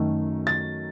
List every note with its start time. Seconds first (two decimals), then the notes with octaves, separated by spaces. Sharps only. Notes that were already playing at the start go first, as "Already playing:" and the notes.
Already playing: F#2 D#3 A3
0.47 A6